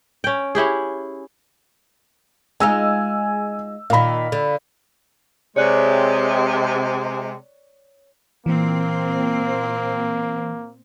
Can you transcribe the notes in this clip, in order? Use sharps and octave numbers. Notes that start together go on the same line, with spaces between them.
C#4 G5
C#4 E4 G4 G#4
G#3 D#4 F4 G#5 E6
A#2 D#3 F5 B5
D3
C3 G#3 C#5 D5 F#6
A#2 E3 A#3 C4